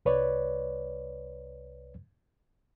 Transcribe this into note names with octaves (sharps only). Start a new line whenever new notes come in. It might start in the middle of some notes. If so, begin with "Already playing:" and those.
C2 B4 C#5 D5